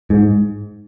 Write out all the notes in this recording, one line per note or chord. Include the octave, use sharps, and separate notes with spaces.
G#2